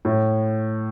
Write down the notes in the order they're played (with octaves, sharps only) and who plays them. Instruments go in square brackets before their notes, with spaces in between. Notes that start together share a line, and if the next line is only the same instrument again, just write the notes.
[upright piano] A2